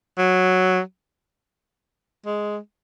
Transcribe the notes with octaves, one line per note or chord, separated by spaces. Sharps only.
F#3
G#3